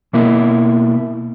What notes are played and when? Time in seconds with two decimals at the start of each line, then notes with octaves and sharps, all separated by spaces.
0.13 B2 A#3 E4